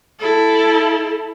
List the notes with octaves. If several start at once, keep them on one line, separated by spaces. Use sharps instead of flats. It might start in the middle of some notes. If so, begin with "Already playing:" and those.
E4 A4